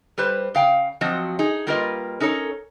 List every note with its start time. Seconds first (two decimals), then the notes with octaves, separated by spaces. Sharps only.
0.18 G3 G4 B4 C5
0.55 C#3 F5 G5
1.01 F3 F#3 C4 F#4 D#5
1.39 D#4 G#4
1.67 G3 A#3 F4 A#4 B4 D#5
2.20 C#4 D#4 A4 A#4 C#5